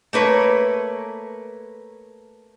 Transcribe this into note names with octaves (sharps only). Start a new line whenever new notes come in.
A3 A#3 B4 C#5